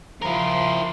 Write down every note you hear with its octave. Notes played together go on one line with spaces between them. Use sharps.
F3 E4 A#4 C6